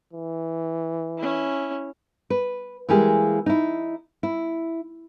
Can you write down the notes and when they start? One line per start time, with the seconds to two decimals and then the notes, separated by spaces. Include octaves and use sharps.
0.13 E3
1.18 C#4 E4
2.30 B4
2.89 E3 G3 G#3 A#3 G4 G#4
3.46 D#4 E4
4.23 E4